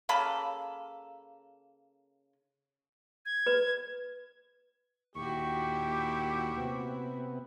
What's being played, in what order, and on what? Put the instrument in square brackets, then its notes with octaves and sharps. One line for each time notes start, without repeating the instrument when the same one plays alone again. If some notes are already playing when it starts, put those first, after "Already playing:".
[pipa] C#3 A#3 A4 B5
[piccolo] G#6
[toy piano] B4
[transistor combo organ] D#2 [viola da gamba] A#2 E4 F#4 [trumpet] G4 [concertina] C#6
[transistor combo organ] C3 B3